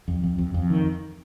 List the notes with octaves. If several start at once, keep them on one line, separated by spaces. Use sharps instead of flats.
F2
F2
F2
F2
D#3